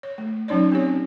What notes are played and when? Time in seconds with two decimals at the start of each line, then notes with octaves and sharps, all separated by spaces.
0.03 C#5
0.18 A3
0.48 F#3 C#4 D#4 C#5 D5
0.72 C4 G4 C#5